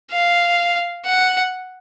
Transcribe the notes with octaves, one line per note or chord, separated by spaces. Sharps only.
F5
F#5